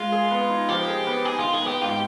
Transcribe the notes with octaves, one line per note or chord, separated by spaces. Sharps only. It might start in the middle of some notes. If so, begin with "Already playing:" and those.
Already playing: G#3 F4
G#4
B3
D#4
F3 G4
G#4
B3
D#4 G#4
D#3 F4
G#4
B3 G4
G#2 F4
G4